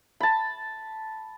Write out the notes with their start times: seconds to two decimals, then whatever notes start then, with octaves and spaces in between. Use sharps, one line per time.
0.20 A5 B5